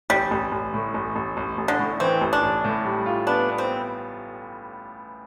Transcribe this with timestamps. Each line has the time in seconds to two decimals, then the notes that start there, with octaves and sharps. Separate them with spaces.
0.10 A1 G3
0.31 A1
0.52 A1
0.74 A2
0.94 A1
1.16 A1
1.37 A1
1.58 A1
1.68 D3
1.79 A2
2.00 E3 C4
2.21 A1
2.33 D4
2.43 A1
2.64 A2
2.85 G3
3.06 F4
3.27 B3 D4
3.49 B3
3.58 C4